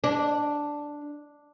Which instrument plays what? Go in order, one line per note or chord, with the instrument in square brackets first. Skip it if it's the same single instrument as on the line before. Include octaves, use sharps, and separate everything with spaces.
[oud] D4